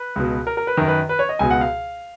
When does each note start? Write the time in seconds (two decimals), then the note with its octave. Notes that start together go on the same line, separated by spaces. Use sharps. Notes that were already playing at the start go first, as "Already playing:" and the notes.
Already playing: B4
0.16 C#2 B2
0.47 A#4
0.57 A#4
0.67 B4
0.77 F#2 D#3 A#4
0.88 B4
1.09 B4
1.19 C#5
1.29 D#5
1.39 C#2 B2 G#5
1.51 F#5
1.61 F5